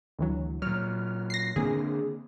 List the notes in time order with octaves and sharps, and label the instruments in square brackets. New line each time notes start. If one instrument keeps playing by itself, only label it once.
[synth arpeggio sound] D2 E3 F#3
[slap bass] A#2 F#3 [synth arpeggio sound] F6
[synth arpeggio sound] A#6 C7
[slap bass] D3 A#3 C4 [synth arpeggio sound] G#4